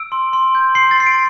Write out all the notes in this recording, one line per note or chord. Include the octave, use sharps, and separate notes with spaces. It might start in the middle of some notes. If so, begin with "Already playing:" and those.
Already playing: E6 D7
C6
C6
G6
C6 C7
A6
C6 C7
D7